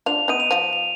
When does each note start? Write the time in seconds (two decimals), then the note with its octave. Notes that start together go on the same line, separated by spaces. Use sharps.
0.06 D4 F4 F7
0.28 B3 D#4 D#7
0.40 F7
0.51 F3
0.73 F7